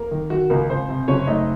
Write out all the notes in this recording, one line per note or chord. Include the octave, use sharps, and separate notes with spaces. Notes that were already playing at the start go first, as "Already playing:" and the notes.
Already playing: A#3 A#4
D#3
D#3 F#4
C#2 A#3 A#4
C#2 C4 C5
C3
F#1 C#4 C#5
A3 D#4 D#5